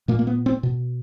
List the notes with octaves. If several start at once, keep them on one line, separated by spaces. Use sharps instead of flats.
A#2 A#3
A#3
B3
C4
B2